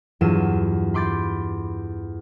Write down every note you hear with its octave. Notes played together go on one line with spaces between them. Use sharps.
E2 G2 F#3 F4 D#7 E7
B5 C6 D6 G6 A6